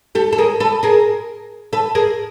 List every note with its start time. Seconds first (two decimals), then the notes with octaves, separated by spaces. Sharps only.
0.15 G4 A4
0.33 A4
0.38 G#4 A#4
0.60 A4 B4
0.83 G#4 A#4
1.73 A4 B4
1.95 G#4 A#4